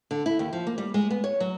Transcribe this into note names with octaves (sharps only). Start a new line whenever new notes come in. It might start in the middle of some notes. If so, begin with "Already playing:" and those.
D3
E4
D#2
F3
A#3
G3
G#3
B3
C#5
F#3